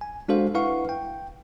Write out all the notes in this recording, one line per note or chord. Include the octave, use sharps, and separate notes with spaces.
G#5
G#3 D4 F#4 A4 C5 F5
E4 B4 F5 F#5 C#6
G5